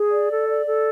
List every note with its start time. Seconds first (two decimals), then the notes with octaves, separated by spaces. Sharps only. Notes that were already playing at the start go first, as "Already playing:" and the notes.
Already playing: G#4
0.12 D5
0.30 A4
0.49 D5
0.66 A4